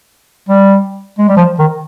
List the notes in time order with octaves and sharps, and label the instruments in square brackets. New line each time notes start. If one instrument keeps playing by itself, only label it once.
[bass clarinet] G3
G#3
G3
F3
D#3